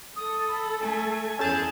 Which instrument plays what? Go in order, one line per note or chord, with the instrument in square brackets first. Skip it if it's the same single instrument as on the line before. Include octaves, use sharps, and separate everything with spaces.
[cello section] A4 [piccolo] D#6
[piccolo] B5
[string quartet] A3 [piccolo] G#5
[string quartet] E2 G#4 A5 [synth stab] C#4 A4 A6 [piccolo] G6